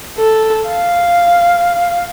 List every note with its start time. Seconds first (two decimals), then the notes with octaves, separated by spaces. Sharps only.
0.18 A4
0.68 F5